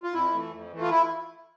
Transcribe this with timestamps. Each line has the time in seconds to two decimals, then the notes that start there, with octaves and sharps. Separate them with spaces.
0.04 F4
0.14 F2 E4
0.32 E3 A3
0.52 F2
0.71 E3 A3
0.81 F4
0.91 E4